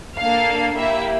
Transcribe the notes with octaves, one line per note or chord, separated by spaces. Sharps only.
A#3 D4 A4 F5
A#3 E4 G4 E5